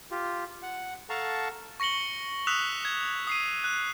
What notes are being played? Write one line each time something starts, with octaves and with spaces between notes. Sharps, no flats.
F4 G4
F#5
A4 F5 F#5 A5 A#5 C#6
C#6 A#6 C#7 F#7 G7
D#6 E6 F#6 B6 E7 F7
G#6
D#6 C7 D#7
F#6